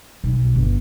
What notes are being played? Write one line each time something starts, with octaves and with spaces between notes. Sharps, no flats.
B1
G1